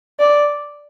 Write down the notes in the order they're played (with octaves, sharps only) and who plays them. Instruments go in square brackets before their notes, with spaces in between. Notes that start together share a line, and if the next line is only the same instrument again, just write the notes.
[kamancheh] D5